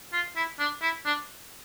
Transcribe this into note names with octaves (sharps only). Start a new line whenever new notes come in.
F4
E4
D4
E4
D4